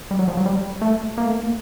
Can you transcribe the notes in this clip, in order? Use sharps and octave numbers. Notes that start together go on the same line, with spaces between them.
G3
F#3
F3
F#3
G3
A3
A#3
A3
A#3